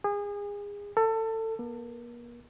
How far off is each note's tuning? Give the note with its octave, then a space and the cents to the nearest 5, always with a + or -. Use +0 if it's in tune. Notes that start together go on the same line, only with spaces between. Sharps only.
G#4 -30
A4 +25
A#3 +40